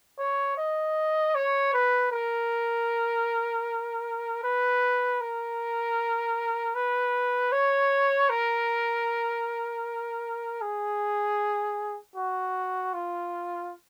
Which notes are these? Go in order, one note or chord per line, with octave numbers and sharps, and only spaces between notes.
C#5
D#5
C#5
B4
A#4
B4
A#4
B4
C#5
A#4
G#4
F#4
F4